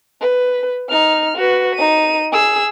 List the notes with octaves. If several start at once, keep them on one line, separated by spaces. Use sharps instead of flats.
B4
D#4 F6
F#4 B4
D#4 D#7
G#4 E6